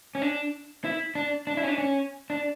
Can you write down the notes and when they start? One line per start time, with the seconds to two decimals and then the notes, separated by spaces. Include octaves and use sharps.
0.15 C#4
0.22 D4
0.84 E4
1.15 D4
1.47 D4
1.57 E4
1.63 C#4
1.68 D4
1.78 C#4
2.30 D4